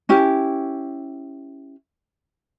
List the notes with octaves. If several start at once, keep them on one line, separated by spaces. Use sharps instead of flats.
C#4 E4 G4